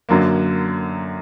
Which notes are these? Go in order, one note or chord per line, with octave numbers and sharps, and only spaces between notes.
F#2 D3 F#3 A#3